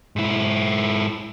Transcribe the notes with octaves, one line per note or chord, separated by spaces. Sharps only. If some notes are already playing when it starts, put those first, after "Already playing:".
G#2 E4